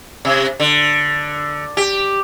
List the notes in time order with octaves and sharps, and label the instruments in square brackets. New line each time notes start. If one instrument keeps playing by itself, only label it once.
[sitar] C3
D3
G4